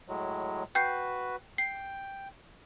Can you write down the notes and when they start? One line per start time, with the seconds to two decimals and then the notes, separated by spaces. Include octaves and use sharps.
0.08 A2 F#3 G#3
0.75 F#4 B4 G5 G6 C7
1.58 G5 C7